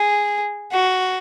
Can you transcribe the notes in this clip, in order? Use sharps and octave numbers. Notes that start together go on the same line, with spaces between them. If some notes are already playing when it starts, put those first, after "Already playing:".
Already playing: G#4
F#4